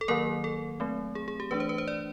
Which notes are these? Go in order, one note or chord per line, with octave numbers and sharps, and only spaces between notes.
A4
D#3 F#3 A#3 A#4
A4
F#3 A3 C4
G#4
G#4
G4
E3 A3 D4 B4
C5
B4
C5
D5